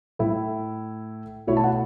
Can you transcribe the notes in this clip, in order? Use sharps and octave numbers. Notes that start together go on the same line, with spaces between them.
A2 A3 E4
B2 A3 E4 C#5
A5
F#5